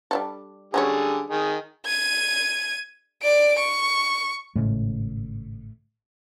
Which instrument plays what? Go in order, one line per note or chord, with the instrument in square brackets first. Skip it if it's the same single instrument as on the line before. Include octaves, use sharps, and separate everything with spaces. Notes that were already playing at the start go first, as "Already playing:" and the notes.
[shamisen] G3 D4 A4
[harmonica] D3 G3 G#4 [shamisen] F#3 C#4 C#5
[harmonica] D#3 G#4
[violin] G#6 D#7
D5 D7
C#6
[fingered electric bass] G#1 C#3 G#3 [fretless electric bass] A2